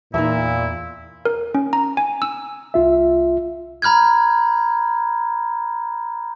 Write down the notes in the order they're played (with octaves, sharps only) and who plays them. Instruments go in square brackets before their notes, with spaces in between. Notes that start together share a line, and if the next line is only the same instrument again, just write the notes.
[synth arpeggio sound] E2 [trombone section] A#2 [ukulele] D#4 E5 [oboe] E4
[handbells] A#4
C#4
A#5
G#5
E6
[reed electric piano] C2 F4 E5
[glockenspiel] A#5 B5 F6 G6 G#6